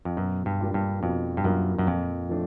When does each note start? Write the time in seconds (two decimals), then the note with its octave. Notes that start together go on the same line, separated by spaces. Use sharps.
0.05 F2
0.17 F#2 B2
0.46 G2
0.60 G3 A#3 D4 F4
0.74 G2
1.02 F2 B2
1.37 G2
1.44 F#2 G3 A#3 D4 F4
1.78 F#2
1.87 F2 A#2
2.29 F3 A3 D4